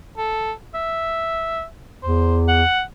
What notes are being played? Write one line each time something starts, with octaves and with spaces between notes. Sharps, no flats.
A4
E5
E2 C5
F#5